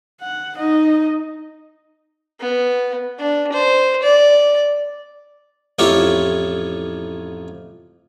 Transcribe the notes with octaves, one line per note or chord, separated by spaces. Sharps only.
F#5
D#4 D#5
B3
D4
C5
D5
A1 F2 E4 F4 G4 C#5